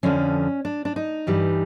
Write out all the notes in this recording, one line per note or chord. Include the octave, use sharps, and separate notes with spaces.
F2 D3 F3 C#4
D4
D4
D#4
G2 E3 G3